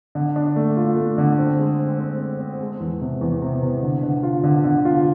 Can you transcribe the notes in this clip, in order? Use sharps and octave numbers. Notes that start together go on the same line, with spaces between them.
D3
D4
A3
F4
A3
D3
C4
G#3
C4
C4
C4
C4
G#3
E2
C3
E2
C3
C3
D3
D3
F4
D3
D3
F4